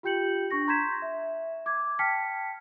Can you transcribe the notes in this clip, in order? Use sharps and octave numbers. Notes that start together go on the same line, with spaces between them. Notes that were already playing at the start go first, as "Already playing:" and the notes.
F4 G4 G5 G6 C#7 F#7
D4 C#6 A#6
A#5 C6 G6 G#6 B6 E7
E5
D6 G#6
G5 A5 F6 B6 C#7